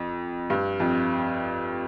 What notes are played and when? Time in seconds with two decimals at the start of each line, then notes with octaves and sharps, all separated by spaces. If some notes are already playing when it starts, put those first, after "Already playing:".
Already playing: F2
0.50 G2
0.80 F2